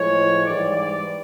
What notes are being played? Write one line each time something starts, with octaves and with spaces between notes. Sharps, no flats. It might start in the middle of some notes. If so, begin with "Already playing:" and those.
Already playing: A2 F3 G#3 C#5
G#2 E3 G3 D5
D5